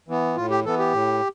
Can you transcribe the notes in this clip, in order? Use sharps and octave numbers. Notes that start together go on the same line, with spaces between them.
E3 B3
A2 F4
G4
E3 B3 A4
G4
A2